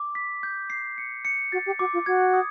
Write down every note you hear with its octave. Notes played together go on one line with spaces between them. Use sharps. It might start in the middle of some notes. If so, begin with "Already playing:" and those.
Already playing: D6
B6
G6
C7
C#7
C#7
F#4 A6
G4
F#4 D6
F4
F#4 G#6
D#6